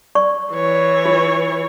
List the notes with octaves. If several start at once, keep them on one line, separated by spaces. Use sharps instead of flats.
D5 C#6
E3 C#5
F4